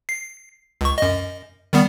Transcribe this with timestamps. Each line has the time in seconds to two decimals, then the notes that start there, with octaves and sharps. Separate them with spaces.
0.09 C7
0.81 C#2 C#6
0.98 F#2 D#5
1.73 D#3 G3 B3